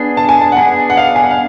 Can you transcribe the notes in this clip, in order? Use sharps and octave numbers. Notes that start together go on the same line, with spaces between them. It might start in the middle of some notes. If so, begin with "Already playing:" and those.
Already playing: B3 D4 G#4
A5
G#5
A5
F#5
B3 D4 G#4 G#5
F#5
F5
G#5
F#5
F5